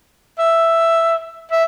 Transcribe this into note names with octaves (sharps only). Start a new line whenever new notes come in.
E5
E5